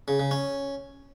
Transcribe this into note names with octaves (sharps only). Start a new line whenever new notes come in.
C#3
C#3
C#4